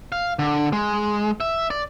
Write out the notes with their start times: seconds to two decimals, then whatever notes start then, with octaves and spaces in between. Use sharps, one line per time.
0.12 F5
0.39 D3
0.73 G#3
1.40 E5
1.70 D5